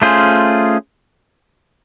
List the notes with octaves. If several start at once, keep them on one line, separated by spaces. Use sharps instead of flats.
A3 C#4 F4 G#4 C5